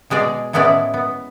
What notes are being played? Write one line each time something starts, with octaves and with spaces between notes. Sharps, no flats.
B2 G#3 G#4 D5
A2 G#3 B3 C#4 E4 D5
B3